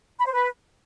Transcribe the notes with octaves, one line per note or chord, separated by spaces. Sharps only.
B5
C5
B4